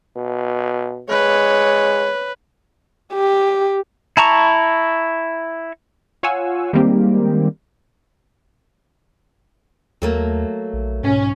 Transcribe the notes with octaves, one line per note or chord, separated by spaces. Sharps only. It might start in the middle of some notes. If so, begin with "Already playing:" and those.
B2
G#3 B4 C#5
G4
E4 A5 A#5 C#6
F4 C#5 F5 F#5 G#5 E6
D#3 G3 G#3 A#3 C4 G4
D#2 F#3 A3 A#3
A#1
B1 G#2 C#4